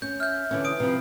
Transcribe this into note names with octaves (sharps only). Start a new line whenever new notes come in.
C#4 G6
E5 F6 G6
D3 E3 C#4
D#6 D7
C3 F3 B4